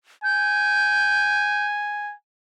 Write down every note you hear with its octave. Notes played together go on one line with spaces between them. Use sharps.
G#5 G6